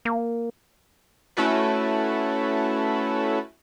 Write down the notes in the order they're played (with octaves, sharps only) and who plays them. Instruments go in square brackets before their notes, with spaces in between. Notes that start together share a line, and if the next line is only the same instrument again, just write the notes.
[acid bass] A#3
[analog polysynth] A3 C#4 E4 F#4 A4 B4